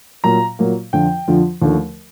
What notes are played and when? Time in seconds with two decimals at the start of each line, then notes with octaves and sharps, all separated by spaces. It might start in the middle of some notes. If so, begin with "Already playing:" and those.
0.24 A#2 F#3 A#3 A#5
0.59 A#2 F#3 A#3
0.93 F2 D3 F3 G5
1.28 F2 D3 F3
1.62 D#2 D3 F3 A3